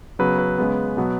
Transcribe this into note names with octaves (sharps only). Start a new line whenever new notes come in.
C#3 F#3 B3 B4
B4
C#3 G#3 B3
B2 F#3 B3